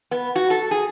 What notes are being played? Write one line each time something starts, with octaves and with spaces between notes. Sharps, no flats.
B3
F#4
A4
G#4